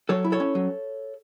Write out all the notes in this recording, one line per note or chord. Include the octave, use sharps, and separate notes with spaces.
F#3 A4 C#5
E4
A4 C#5
C#4
F#3